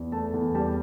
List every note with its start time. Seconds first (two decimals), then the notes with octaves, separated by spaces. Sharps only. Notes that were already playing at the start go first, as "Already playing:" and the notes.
Already playing: E2
0.12 A3 A5
0.34 E2
0.55 G3 A5